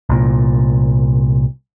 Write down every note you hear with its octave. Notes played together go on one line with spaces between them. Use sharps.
C2 A#2